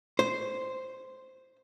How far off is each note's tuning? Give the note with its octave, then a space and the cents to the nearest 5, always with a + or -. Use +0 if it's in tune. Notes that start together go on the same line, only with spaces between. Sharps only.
C5 -5